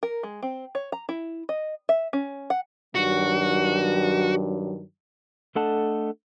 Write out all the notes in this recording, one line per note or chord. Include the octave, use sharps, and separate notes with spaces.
A#4
G#3
C4
C#5
A#5
E4
D#5
E5
C#4
F#5
G2 D#3 F#3 F#4
A3 D4 A4 D#5 F#5 A5